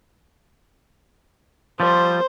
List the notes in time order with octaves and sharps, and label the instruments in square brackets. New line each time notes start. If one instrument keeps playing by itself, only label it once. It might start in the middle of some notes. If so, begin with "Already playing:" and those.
[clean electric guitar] F3 G3 [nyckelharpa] C5